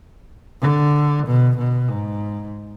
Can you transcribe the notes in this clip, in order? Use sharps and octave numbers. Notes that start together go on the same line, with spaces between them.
D3
B2
B2
G#2